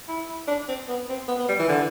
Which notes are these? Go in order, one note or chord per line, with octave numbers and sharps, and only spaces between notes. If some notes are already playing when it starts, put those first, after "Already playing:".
E4
D4
C4
B3
C4
B3
B3
G3
E3
D3